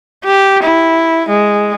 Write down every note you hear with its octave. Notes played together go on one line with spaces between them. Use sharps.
G4
E4
G#3